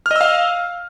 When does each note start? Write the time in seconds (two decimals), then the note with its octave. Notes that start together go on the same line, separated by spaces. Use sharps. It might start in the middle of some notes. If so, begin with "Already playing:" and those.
0.06 F6
0.11 D#5
0.16 E6
0.21 F5